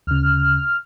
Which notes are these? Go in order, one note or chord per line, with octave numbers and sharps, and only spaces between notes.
D2 C#3 F6